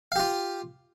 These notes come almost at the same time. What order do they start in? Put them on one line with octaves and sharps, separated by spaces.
F5 G4 F4